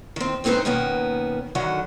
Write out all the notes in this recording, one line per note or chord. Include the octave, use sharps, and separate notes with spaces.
D#3 C4
D#2 G#2 C4 D#4 B4 C5
B2 D#3 A#3 B3 C#4
D3 D#3 F#3 F#5